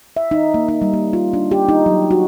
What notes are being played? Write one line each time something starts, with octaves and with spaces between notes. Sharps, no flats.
E5
D#4
A#3
D#4
G3
A#3
F4
D4
G4
D#4
F#3
F#4